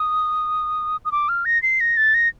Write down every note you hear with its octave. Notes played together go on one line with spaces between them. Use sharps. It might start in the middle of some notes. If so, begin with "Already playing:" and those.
Already playing: D#6
D#6
D6
F6
A#6
C7
A#6
A6
A#6